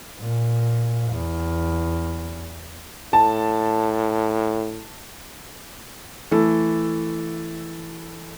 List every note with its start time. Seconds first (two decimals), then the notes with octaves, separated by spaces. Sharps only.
0.19 A#2
1.11 E2
3.13 A2 A5
6.31 E3 A3 A4